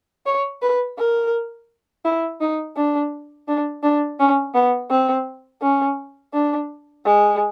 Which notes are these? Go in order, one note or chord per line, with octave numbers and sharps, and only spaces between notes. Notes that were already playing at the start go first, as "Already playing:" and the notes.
C#5
B4
A#4
E4
D#4
D4
D4
D4
C#4
B3
C4
C#4
D4
G#3